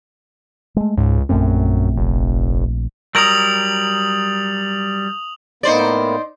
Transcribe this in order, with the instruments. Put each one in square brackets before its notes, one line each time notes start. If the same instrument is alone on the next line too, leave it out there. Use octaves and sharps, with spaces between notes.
[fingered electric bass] G#3 A3
[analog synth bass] C#2 [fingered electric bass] G#2
[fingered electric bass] A#1 A3 C4 [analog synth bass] F#2
[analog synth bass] F1
[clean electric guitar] F#3 G3 A#4 [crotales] D#6 F7 F#7
[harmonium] A2 A#3 B3 [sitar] D#4 C5 D5